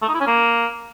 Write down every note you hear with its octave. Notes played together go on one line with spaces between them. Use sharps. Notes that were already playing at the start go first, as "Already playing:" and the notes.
A3
D#4
E4
C#4
A#3